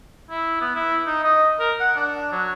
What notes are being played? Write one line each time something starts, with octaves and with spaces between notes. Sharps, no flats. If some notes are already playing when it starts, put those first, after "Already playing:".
E4
B3
E4
D#4
D#5
A#4
F#5
D4
F#3